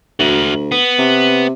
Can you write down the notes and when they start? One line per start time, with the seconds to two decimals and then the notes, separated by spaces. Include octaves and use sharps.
0.20 D2 F#4 E5
0.72 B3
0.98 C3